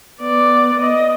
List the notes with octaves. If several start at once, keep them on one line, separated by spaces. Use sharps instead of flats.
B3 D5
D#5